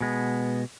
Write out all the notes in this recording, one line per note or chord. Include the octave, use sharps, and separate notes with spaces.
B2 G#3 B3